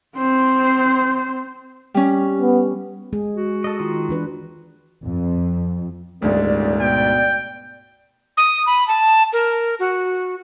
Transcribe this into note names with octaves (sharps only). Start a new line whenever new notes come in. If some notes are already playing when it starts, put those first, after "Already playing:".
C4 C5
G3 C#4
B3
G#3 G#4
F#4
A4 D#5
D#3 F4 D#6
E3 D4 B4
F2
D#1 D2 G#2 D5
B2 G5
D#6
B5
A5
A#4
F#4